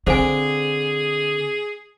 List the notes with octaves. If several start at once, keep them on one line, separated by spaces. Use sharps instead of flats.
D3 C4 G#4 C5 F5 G#5